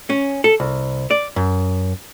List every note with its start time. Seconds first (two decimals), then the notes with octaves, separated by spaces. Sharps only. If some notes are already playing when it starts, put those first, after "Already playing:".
0.10 C#4
0.44 A4
0.60 C2
1.11 D5
1.36 F#2